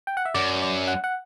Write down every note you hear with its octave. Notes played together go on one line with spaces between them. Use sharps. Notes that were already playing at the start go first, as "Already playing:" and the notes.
G5
F#5
E5
F#2 D5
D5
F#5
F#5